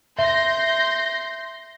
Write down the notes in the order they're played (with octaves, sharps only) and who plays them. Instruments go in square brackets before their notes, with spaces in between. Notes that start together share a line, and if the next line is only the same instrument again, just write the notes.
[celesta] E5 [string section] C6 G6 A#6